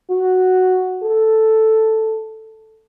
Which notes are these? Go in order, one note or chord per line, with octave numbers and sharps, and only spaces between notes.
F#4
A4